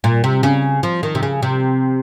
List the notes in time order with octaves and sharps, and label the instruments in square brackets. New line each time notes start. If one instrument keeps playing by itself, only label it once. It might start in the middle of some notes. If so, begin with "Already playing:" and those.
[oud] A#2
C3
C#3
F3
D#3
C3
C#3
C3